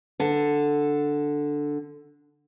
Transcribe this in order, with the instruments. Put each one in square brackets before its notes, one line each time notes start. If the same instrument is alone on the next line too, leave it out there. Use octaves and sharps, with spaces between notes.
[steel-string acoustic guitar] D3 A4